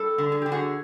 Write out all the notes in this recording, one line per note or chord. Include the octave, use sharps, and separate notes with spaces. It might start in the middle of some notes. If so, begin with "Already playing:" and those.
Already playing: G3 A4
D3
G#4
D3 G4
F#4 G#4